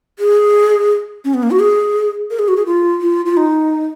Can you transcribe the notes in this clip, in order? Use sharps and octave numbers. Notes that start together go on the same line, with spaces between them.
G#4
C#4
B3
A#3
F#4
G#4
A#4
G#4
F#4
G#4
F4
F4
F4
D#4